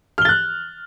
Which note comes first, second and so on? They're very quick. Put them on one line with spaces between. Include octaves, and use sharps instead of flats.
F6 G7 A6 F#6